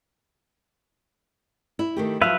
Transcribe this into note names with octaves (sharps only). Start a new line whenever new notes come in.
E4
D#3 A3 G4
F3 F#3 B4 E5 F5